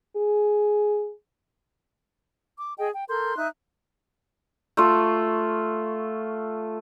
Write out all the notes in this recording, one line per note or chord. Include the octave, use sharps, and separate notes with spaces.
G#4
D6
G#4 D#5 G5
G5
A4 A#4 C6 G6
D#4 E5 F#6
A3 F4